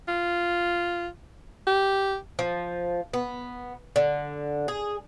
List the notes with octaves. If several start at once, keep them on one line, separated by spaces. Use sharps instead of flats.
F4
G4
F3
B3
D3
G#4